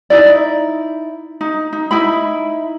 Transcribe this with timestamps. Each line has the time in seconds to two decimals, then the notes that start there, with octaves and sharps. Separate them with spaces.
0.10 D#4 E4 D5
1.41 D#4
1.73 D#4
1.91 D#4 E4 B5